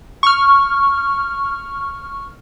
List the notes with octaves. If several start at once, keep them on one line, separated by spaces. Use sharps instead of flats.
C#6 F6